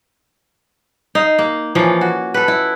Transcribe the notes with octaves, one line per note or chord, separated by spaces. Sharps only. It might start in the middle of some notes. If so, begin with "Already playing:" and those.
D#4 F5
A#3
E3 F3 A#3 C#4
F#4
A4 B4
E4